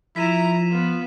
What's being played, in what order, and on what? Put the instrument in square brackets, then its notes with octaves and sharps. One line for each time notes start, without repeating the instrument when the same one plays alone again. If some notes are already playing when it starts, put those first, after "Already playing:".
[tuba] F3 [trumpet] E4 [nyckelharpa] A#5 [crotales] B6 D#7 E7
[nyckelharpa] B3 [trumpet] F4